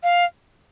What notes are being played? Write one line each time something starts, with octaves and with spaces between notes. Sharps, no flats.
F5